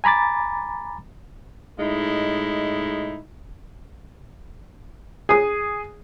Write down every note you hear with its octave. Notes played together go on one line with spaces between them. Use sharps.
G#5 A#5 B5 D6 A6
A2 G#3 D#4 E4
G#4 D#6